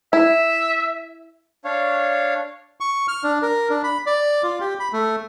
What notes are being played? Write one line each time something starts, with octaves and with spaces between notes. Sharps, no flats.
E4 E5
D4 C#5 F5
C#6
F6
D4
A#4
D4
B5
D5
F4
G4
B5
A3